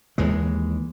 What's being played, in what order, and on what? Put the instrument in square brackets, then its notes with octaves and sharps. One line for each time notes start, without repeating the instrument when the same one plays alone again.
[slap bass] D#2 E3 G#3